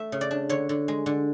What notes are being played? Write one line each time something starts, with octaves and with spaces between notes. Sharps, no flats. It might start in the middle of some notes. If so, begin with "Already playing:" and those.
Already playing: A3 E5
C#3
D5
D4
D3 C#5
D3
G#3
D3